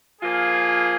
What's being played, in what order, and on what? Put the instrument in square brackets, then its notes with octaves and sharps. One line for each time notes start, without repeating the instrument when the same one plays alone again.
[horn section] A#2 F3 A#3 F4 G#4